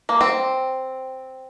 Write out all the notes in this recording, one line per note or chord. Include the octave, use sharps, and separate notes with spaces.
A#3
C4